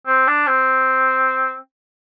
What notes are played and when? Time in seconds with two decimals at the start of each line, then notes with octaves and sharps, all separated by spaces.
0.07 C4
0.28 D4
0.47 C4